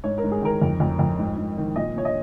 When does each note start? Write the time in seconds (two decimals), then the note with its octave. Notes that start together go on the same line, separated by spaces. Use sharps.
0.04 G#2 C#5
0.18 A#4
0.24 G#2
0.31 G#4
0.42 D#3 A#4
0.62 F2
0.80 F2
0.99 F2
1.19 G#2
1.38 G#2
1.57 D#3
1.76 A#2 D#5
1.96 A#2 C#5
2.05 D#5